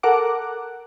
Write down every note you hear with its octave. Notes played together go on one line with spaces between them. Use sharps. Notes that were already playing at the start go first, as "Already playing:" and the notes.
A4 A#4 F#5 D6